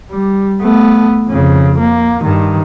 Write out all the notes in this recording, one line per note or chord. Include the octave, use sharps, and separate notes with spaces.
G3
A3 B3
F2 C#3
A#3
G2 D#3